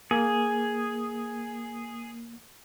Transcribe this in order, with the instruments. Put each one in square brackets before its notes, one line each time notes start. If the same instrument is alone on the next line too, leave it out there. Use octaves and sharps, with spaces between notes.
[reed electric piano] A#3 [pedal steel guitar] G#4